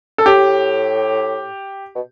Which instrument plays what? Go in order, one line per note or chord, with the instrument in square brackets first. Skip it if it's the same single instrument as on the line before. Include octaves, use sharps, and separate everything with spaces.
[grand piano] A4
[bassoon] A2 [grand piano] G4
[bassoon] B2